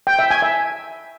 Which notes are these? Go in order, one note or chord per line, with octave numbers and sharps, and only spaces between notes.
G5
E5
G#5
E5